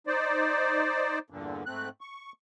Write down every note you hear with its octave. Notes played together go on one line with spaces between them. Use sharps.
D#4 C5 D5
E2 G2 A#2 D3
G#2 A3 C4 F#6
C#6